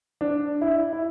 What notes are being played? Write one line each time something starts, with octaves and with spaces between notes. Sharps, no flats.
D4
E4
E4